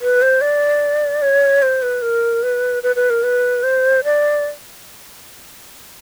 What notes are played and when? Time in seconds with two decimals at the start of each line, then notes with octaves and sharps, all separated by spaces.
0.02 B4
0.22 C5
0.41 D5
1.22 C#5
1.62 C5
1.82 B4
2.02 A#4
2.43 B4
2.83 B4
2.96 B4
3.10 A#4
3.23 B4
3.63 C5
4.04 D5